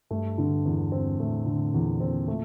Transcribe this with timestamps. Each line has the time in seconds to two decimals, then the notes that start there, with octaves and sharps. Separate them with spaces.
0.11 G2 A3
0.38 D3
0.65 E2
0.92 C4
1.19 A2 A3
1.46 D3
1.73 E2 A#2
2.00 C4
2.28 A3